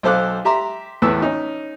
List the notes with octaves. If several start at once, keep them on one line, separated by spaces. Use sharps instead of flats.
B1 A4 C5 F5 D6 F#6
G4 E5 A#5 C6
E2 A2 E3 B4 E6
C#4 D#4